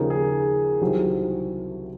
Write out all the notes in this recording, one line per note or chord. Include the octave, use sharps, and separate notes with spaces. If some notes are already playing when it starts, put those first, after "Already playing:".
Already playing: D#2 C#3 F3 A#3 D#4
G#4
C2 C3 D#3 F#3 C4